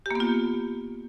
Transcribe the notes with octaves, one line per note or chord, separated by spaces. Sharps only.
A#3 B3 F4 G4